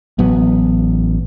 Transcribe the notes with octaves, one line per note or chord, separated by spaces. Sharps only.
A1 F#3 B3